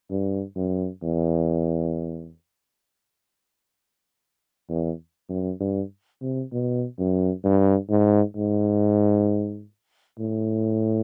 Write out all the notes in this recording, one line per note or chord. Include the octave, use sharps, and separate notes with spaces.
G2
F#2
E2
E2
F#2
G2
C3
B2
F#2
G2
G#2
G#2
A2